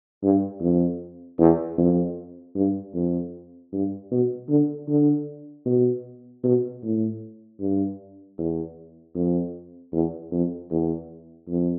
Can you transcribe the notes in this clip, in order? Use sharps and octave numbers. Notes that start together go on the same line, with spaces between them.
G2
F2
E2
F2
G2
F2
G2
B2
D3
D3
B2
B2
A2
G2
E2
F2
E2
F2
E2
F2